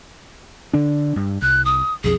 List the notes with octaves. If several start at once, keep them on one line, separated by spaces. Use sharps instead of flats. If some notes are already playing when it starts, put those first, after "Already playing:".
D3 D4
G2
C2 F#6
D#6
B1 F2 G#4